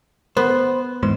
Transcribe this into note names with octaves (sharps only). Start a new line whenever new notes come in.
B3 C5
E2 G#2 C5